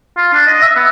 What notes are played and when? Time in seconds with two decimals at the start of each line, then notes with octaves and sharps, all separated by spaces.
0.17 F4
0.34 D4
0.47 D#5
0.62 E5
0.76 B3